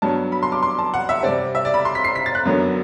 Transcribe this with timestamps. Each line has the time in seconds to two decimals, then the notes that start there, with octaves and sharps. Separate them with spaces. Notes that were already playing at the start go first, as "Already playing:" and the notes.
0.02 G2 F#3 B3 A5
0.32 B5
0.43 C6
0.52 D6
0.63 C6
0.78 A5
0.94 F#5
1.09 E5
1.23 C3 G3 C4 D5
1.55 E5
1.65 D5
1.74 B5
1.85 C6
1.95 B6
2.04 C7
2.16 B6
2.26 A6
2.35 F#6
2.46 F#2 D3 F#3 B3